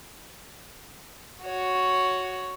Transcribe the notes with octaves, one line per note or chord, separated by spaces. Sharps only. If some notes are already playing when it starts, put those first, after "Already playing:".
F#4 C#5